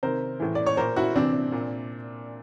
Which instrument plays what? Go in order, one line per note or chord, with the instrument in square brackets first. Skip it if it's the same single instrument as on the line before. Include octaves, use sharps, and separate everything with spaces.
[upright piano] C3 D#3 A#4 C5
A2 E3
D5
C#5
A#2 A#4 C5
E4 F#4
C3 E3 C4 D4
A#2